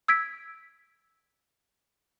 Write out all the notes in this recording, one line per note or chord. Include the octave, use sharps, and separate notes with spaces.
E6 G#6 B6 D7